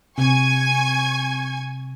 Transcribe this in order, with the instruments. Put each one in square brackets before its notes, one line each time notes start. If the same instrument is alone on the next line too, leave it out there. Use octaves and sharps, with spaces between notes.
[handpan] C3 [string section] G#5 C#6 G#6